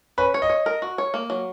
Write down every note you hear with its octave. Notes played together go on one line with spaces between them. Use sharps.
C#4 B4
C#5
D#5
C#5
A#4
F#4
C#5
A#3
F#3